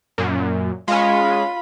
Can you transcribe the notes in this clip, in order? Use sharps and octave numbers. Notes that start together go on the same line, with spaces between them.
F#2 A#2
G#3 C#4 F4 B5